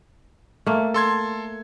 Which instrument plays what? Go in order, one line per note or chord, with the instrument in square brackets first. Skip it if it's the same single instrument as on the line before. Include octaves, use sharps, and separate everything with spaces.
[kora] A3 A#3
[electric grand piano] A4 C6 G#6